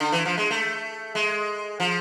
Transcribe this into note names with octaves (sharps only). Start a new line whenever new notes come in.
D3
E3
F3
G#3
A3
G#3
F3